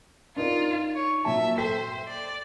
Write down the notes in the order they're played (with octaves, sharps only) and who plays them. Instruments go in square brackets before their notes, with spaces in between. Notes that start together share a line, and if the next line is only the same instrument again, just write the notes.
[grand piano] D4 D#4 A#4 [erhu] F4
[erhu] C#5
[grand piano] A#2 F#3 A5 [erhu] E5
[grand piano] A4 G5 B6 [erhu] C5
[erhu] D5